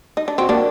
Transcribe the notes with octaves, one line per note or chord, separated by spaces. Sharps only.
D#4
D4
C4 F#4
A#3 D4